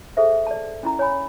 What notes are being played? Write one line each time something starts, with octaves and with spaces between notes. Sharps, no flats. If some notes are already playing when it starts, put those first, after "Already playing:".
G#4 A4 C5 E5
D5 A5
C#4 E4 A#5
C#5 G#5 B5